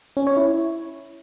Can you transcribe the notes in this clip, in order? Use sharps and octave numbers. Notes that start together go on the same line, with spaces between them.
C#4
C#5
E4